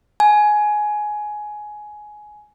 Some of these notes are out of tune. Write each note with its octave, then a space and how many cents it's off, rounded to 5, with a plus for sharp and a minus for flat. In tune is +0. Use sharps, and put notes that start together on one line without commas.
G#5 +15